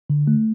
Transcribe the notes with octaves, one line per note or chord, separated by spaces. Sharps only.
D3
A3